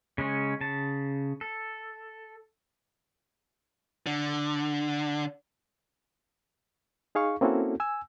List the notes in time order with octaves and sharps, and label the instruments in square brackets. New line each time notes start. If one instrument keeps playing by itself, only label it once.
[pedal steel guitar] C#3 G#3 C#4
C#3 A5
A4
[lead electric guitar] D3
[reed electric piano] D#4 G#4 F5 C#6
A#3 C4 C#4 E4 F#4 A4
G#5 E6